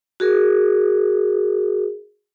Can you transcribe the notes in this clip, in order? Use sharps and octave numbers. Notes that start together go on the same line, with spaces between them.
F#4 G#4 A#4